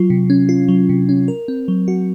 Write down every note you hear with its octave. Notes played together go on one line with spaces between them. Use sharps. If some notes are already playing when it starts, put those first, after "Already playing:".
Already playing: F#3 F4
C3
C#4
F4
F#3
C3
C#4
A#4
C4
F#3
F#4